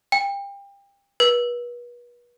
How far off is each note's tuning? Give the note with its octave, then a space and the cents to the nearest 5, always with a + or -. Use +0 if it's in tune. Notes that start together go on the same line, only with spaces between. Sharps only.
G5 +30
B4 -35